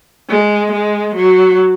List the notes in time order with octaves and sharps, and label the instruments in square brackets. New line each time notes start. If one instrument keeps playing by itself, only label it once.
[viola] G#3
G#3
F#3